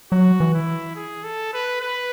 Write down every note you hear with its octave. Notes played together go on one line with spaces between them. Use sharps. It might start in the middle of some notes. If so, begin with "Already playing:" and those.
F#3 F#4
E3
E4
G#4
A4
B4
B4